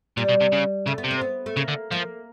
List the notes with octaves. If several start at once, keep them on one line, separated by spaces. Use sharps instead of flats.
A#2 G3
B2
C3
C#3
C#3 A3
B3
C3
C4
B3
A3
C#3 A#3
D3
F3 A#3